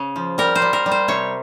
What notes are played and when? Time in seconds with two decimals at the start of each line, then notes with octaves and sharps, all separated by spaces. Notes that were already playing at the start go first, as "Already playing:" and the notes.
Already playing: C#3
0.16 F3
0.38 G3 A#4
0.55 C5
0.62 G3
0.73 A#4
0.86 G3
0.91 C5
1.08 C3 C#5